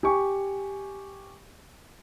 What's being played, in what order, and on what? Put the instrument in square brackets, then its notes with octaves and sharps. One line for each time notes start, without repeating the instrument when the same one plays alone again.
[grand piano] G4 G#5 C#6